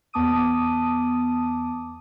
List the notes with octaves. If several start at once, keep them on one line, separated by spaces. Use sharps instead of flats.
E2 B3 A5 D6 D#6 D#7